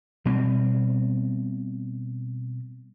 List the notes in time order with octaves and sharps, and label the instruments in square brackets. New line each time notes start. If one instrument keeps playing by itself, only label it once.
[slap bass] B2 G3 B3 C4